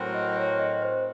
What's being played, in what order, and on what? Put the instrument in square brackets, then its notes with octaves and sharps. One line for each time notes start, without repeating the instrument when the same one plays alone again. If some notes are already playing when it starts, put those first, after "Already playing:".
Already playing: [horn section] A2 F#3 C4 F#4 A#4
[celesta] D#5
C#5
D#5
C5